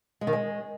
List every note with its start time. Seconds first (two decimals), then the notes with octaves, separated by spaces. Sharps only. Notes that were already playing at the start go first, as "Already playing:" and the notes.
0.21 G#3
0.27 D#3
0.33 G#3